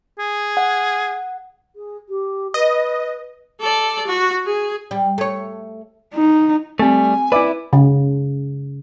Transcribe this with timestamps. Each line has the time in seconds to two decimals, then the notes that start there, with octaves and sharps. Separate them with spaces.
0.19 G#4
0.57 F#5
1.76 G#4
2.09 G4
2.54 B4 D#5
3.61 A4 D5
4.07 F#4
4.46 G#4
4.91 G3
5.18 A3 C#5
6.14 D#4
6.79 G3 A3 C4 G#5
7.32 E4 B4 D5 E5 D6
7.73 C#3